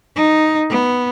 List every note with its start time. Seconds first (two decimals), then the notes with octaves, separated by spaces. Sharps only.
0.16 D#4
0.70 B3